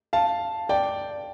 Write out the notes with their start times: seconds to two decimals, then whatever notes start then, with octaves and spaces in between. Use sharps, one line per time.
0.13 F5 A5
0.69 D5 G5